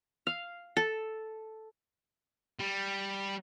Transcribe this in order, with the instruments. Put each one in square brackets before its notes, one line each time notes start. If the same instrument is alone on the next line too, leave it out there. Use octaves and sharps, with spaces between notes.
[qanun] F5
A4
[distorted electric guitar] G3